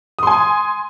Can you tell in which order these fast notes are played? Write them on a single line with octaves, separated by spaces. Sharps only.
D#6 C6 G#5